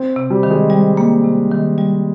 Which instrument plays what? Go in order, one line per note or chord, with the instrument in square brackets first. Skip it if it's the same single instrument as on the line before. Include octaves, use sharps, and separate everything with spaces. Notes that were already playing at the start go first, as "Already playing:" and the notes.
Already playing: [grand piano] C4
[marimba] C3
[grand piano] G3
[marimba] D#3
[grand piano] G#3
[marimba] G3
A#3
C3
D#3
G3